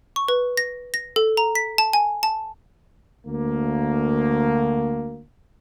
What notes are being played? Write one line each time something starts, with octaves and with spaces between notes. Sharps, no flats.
C#6
B4
A#6
A#6
A4
A#5
B6
A5
G#5
A5
D2 A#3